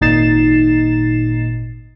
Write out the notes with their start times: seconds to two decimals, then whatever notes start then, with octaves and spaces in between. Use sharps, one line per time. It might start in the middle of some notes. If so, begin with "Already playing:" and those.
0.01 G#1 A#2 D#4 A6 C7 E7